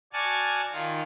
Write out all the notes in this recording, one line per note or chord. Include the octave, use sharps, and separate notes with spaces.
F#4 D5 G#5 A5 C#6 F6
D#3 F4